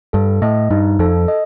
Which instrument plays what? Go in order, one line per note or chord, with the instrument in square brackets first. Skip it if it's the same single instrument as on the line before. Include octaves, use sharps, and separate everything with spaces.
[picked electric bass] G2 [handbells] A4
[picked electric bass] A2 [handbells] D#5
[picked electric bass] G2 [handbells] D#4
[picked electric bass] F2 [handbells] A4
[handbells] D#5